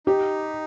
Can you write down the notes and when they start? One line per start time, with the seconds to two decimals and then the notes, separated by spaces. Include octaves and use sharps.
0.07 D#4 G4